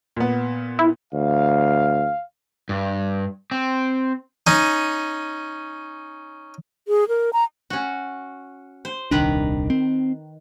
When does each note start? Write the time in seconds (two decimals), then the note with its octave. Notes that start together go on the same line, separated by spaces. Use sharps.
0.17 A#2 B3
0.79 E4
1.14 D2 F5
2.69 G2
3.51 C4
4.47 C#4 D#4
6.88 G#4
7.08 A#4
7.33 A#5
7.70 C#4 F#4
8.85 C5
9.11 D#1 C2 D#3 D4 B4 A#5
9.70 C4